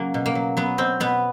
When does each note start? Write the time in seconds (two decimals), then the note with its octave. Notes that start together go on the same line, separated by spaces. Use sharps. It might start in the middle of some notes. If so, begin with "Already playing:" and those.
Already playing: C#3 F#3 A#3
0.14 B2
0.26 A#3
0.35 F#3
0.57 F#3 B3
0.78 B2 C4
1.00 B2 B3